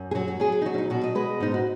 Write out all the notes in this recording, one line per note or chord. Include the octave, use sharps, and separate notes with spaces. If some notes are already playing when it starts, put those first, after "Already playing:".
Already playing: F#2
G#4
F#3 F#4
F#4
F#3 G#4
G#4
D#4
F#3 F#4
C#4
D#4
B2 F#4
D#5
G#3 B4
G#2 D#4
F#4